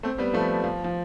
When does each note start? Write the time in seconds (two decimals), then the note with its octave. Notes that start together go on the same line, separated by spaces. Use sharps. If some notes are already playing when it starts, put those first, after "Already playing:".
0.03 A3 C4
0.18 G3 B3
0.33 F3 A3
0.64 F3
0.84 F3